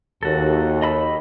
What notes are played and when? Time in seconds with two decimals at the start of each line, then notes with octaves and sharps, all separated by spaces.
0.23 D#2 F#4 A4
0.82 D#5 B5 E6